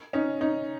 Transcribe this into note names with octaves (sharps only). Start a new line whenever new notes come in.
C#4 D#4
C#4 D#4